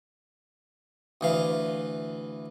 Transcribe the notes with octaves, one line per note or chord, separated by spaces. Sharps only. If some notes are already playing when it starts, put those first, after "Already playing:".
D2 E3 F5